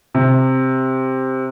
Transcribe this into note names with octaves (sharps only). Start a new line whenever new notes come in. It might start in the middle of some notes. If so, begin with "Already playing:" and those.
C3